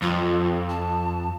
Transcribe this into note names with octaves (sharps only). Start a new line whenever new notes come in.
F2 F4
A5